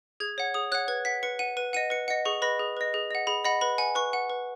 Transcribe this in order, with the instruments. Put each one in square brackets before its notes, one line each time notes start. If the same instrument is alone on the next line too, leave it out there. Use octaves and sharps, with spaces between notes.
[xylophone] G#4 G#6
C#5 F#5
G#4 D#6
C#5 F#6
F#5
B4 G#6
F#5 B6
B4 C#7
F#5 D#7
B4 D#7
D#5 F#5 D#7
B4 C#7
D#5 F#5 C#7
G#4 C#6
B4 D#5 B5
G#4
B4 D#5
G#4
D#5 F#5
G#4 B5
D#5 F#5 B5
B4 B5
F#5 G#5
B4 C#6
F#5
B4